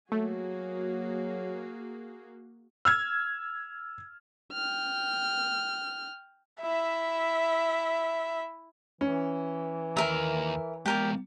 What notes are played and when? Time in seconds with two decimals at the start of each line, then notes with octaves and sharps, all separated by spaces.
0.12 F#3 A3 A#3 F#4 G#4
2.85 E6 F6 G#6
4.52 G5 F6
6.62 E4 E5
9.01 E3 C#4
9.97 D#2 A#4 E5 A#5
10.86 G#3 B3 G4 A#4 D5